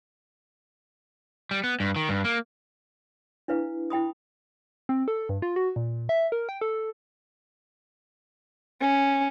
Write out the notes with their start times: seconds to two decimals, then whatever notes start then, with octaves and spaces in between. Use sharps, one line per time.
1.51 G3
1.64 B3
1.80 G2
1.96 D#3
2.09 G2
2.24 A#3
3.48 D4 E4 B4 F5
3.90 E4 G5 B5 D#6
4.89 C4
5.08 A4
5.29 G2
5.42 F4
5.56 F#4
5.76 A#2
6.09 E5
6.32 A#4
6.49 G5
6.61 A4
8.81 C#4